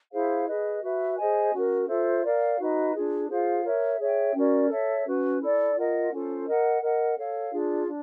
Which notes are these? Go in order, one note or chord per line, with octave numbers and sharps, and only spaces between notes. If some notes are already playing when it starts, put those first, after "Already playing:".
E4 G#4 C5 F5
G#4 B4 D#5
F#4 B4 E5
G#4 C5 D#5 G#5
C#4 F#4 A#4
F4 A4 C5 E5
A#4 D5 F5
D#4 F#4 B4 D#5
D4 F4 G#4
F4 G#4 C5 F5
A#4 C#5 E5
G#4 C#5 E5 G5
C#4 F#4 A#4 D5
A4 C#5 E5
C#4 F#4 B4
E4 A4 D5
F4 A#4 D#5 F#5
C#4 F4 A4 C5
A#4 D#5 F#5
A#4 D#5 F#5
A4 C#5 F5
D4 F4 G#4
D4